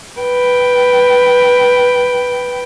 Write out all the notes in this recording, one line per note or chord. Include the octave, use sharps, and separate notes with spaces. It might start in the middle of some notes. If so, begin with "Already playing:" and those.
B4 G5